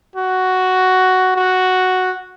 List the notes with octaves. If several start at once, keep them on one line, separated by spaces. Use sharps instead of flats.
F#4
F#4